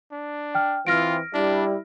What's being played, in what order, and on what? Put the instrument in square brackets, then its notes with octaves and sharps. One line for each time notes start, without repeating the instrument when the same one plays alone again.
[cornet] D4
[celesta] G5 F6
[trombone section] E3 C4 [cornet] F4 [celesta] F6 A#6 D7
[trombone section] G3 E4 [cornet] D4